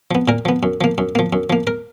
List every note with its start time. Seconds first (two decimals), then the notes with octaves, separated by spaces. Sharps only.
0.11 F3 B3
0.28 A#2 A#4
0.45 F3 B3
0.63 F#2
0.81 F3 A#3
0.98 F#2
1.15 F3 A#3
1.33 F#2
1.50 F3 A#3
1.67 A#4